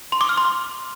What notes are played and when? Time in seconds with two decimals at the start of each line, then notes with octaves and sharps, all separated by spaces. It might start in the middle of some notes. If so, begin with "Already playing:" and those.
0.12 C6
0.21 D6
0.29 F6
0.38 C6